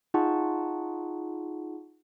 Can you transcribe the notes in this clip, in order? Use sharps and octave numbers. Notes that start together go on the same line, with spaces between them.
D#4 F4 G#4 F#5 A5 C#6